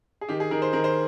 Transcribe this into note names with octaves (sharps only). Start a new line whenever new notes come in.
G#4
D#3 G4
G#4
D#3 A#4
C5
D#3 A#4
C5